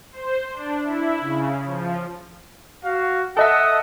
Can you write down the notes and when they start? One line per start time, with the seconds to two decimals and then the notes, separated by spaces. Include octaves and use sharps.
0.12 C5
0.53 D4
0.83 E4
1.21 C#3
1.65 F3
2.84 F#4 F5
3.37 A4 D#5 E5 F#5 D#6